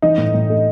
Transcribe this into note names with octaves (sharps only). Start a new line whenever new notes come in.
E3 D#4
A2
A2
A3